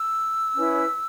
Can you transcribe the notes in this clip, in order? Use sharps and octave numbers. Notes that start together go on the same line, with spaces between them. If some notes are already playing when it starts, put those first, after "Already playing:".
Already playing: E6
C#4 E4 B4